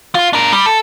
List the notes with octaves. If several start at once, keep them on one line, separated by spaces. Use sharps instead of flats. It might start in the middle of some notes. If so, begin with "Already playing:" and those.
F4
D4 A#4
G3
A4